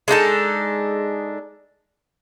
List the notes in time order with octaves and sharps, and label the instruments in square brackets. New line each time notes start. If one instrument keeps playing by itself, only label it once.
[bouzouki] G#3 D4 D#4 A4